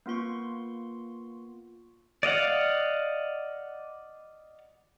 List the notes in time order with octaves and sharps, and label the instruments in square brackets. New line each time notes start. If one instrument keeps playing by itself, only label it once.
[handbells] A#3 B3 F4 C6 C#6
[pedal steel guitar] D5 D#5 F5 F#5